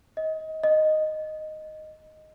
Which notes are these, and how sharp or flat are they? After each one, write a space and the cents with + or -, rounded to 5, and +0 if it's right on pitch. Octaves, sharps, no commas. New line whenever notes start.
D#5 +20
D#5 -5